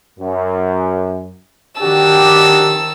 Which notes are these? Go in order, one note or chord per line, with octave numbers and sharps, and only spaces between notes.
F#2
D#3 D4 F#4 G4 A5 E6